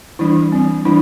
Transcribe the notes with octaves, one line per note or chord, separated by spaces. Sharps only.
E3 G3 D4 E4
G3 C4
E3 G3 D4 E4